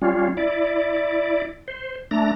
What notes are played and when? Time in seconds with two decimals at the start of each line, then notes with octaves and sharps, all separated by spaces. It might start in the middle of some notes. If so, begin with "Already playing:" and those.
0.02 G3 C#4 F4
0.37 E4 D5
1.68 C5
2.11 A3 D4 A#5